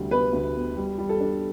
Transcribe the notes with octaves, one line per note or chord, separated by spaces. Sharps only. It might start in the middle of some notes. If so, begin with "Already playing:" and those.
Already playing: D2 C3 G3
B3 B4
D2
B3
G3
G3
A4
D4